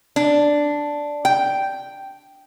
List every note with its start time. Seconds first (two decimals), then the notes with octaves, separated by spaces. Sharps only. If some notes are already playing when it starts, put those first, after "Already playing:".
0.16 D4
1.25 G5